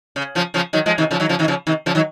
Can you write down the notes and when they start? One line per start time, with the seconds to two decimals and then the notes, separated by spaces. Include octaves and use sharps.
0.16 C#3
0.35 C#3 F3
0.54 C#3 F3
0.73 D#3 F#3
0.86 F3 G#3
0.98 C3 D#3
1.11 C#3 F3
1.20 D#3 F#3
1.29 C#3 F3
1.39 C3 D#3
1.48 C#3 F3
1.67 C3 D#3
1.86 C#3 F3
1.95 D#3 F#3